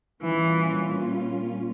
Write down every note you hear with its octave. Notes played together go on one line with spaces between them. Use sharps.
A#2 E3 G3 A#3 C#4 F4